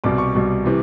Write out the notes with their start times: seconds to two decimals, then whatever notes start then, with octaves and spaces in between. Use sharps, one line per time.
0.04 C2 B2 G3 D6
0.18 C#6
0.35 C2 B2 G3
0.64 C3 E3 G3